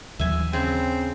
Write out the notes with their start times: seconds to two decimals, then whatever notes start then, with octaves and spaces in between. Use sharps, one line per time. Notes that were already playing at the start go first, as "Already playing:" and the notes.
0.19 D#2 E3 F#3 E5 G#5
0.53 C#3 C4